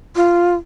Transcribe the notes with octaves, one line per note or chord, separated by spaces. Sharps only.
F4